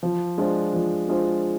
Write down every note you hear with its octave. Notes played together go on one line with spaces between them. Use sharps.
F3
G#3 D4 F4 C5
F3
G#3 D4 F4 C5